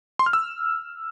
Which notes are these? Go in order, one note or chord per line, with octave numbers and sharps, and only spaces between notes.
C6
F6
E6